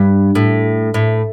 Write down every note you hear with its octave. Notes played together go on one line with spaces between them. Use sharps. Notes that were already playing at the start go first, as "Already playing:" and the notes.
Already playing: G2
A2
A2